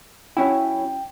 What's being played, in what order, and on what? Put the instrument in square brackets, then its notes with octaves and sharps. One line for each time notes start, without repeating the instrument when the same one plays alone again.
[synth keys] F#3 C#4 E4 [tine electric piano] G5